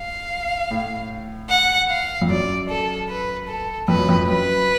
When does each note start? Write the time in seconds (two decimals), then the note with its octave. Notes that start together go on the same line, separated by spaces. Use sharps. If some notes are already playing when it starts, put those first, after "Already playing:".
Already playing: F5
0.71 A2
1.50 F#5
1.90 F5
2.21 F2
2.29 F#2 D5
2.69 A4
3.09 B4
3.48 A4
3.88 F2 B4
3.98 F#2
4.09 F2
4.28 F#2 B4